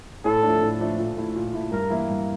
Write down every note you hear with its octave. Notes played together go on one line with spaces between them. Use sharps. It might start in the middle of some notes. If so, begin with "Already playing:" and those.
A2 A4
F3 A3 D4
A2
F3 A3 D4
A#2
A3 E4
A#2
A3 E4
G2 A#4
E3 A#3 E4
G2